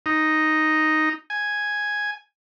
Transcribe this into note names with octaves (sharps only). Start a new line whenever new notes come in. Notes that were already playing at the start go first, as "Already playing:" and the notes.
D#4
G#5